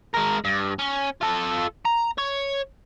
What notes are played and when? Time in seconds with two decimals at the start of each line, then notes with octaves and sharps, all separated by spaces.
0.15 G#3 A#4
0.45 G2
0.79 C#4
1.21 F4 A4
1.85 A#5
2.18 C#5